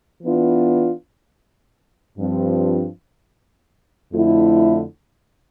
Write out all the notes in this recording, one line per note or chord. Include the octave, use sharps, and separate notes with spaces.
E3 B3 D4 F4
G2 F3 C4
F2 D3 A3 E4